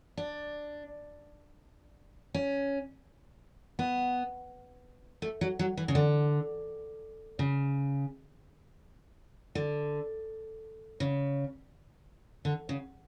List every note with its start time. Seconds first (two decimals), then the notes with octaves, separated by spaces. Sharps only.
0.17 D4
2.34 C#4
3.79 B3
5.22 A3
5.41 F#3
5.59 F#3
5.77 E3
5.88 C#3
5.95 D3
7.39 C#3
9.55 D3
11.00 C#3
12.45 D3
12.69 C#3